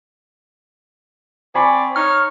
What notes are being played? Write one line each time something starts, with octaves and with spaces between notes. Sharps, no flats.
C4 D5 G#5 B5 C#6
D#4 C#5 F6